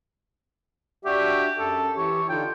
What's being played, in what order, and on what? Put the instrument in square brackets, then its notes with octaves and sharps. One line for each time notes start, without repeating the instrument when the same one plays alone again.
[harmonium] D4 F#4 E5 [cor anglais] G4
[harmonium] F#2 [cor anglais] A4
[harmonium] E3 G4 [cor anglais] C#5
[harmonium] D3 D#4 F4 [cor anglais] G5